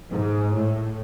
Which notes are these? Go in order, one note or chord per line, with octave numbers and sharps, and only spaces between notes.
G#2
A2